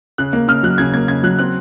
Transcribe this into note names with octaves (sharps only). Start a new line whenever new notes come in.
C#3 F#6
A#3
C#3 F6
F#3 F#6
C#3 G#6
A#3 G#6
C#3 G#6
F#3 F#6
C4 F#6